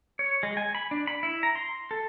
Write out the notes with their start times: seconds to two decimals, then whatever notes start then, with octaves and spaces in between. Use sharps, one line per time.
0.19 C#5
0.43 G#3
0.57 G#5
0.75 B5
0.91 D4
1.07 B5
1.23 E4
1.43 A#5
1.56 C6
1.91 A4